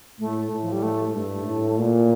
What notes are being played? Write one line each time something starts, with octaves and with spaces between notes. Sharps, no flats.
A2 A3
A2
F3
G3
A3
G2 A3
A2
A#2